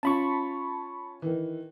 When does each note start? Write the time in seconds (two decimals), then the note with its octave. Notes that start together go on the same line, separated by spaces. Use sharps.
0.03 C#4 F4 A5 B5 C#6
1.22 D#3 E3